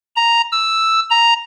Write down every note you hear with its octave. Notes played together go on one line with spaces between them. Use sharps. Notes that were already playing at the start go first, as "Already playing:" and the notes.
A#5
E6
A#5